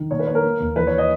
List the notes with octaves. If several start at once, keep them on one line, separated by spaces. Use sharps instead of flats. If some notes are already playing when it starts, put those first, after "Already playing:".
Already playing: D#3
A#2 C#5
B4
A#3 C#5
A#4
A#3
D#2
E3 B4
C#5
D#5